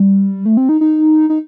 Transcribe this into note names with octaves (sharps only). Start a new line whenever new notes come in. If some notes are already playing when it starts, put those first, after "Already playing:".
Already playing: G3
A3
C4
D#4
D#4
D#4